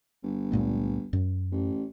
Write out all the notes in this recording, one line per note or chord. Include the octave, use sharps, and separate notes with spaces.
G1
C#2 A#2 A3
F#2
A1